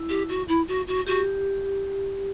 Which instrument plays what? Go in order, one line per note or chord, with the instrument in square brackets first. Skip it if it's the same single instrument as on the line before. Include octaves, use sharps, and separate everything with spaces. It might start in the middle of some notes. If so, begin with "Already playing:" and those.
Already playing: [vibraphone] E4
[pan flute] G4
F#4
E4
F#4
F#4
[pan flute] F#4 [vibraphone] G4